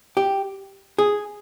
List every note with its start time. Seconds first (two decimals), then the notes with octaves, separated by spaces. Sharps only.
0.17 G4
0.98 G#4